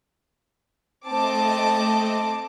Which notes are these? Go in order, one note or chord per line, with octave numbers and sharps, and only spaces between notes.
A3 C4 D#5 A5 D6